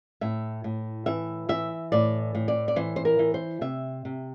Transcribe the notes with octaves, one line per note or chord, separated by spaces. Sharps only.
A2 E5
A2
E3 E5
E3 E5
A2 D5
A2
D5
D5
E3 C5
C5
A#4
E3
C5
C3 E5
C3